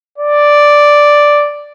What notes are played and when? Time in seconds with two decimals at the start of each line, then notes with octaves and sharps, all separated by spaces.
0.18 D5